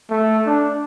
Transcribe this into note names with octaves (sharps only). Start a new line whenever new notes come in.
A3
D4